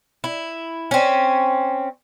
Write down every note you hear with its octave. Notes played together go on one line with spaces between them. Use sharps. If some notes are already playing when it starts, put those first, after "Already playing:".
E4
C4 C#4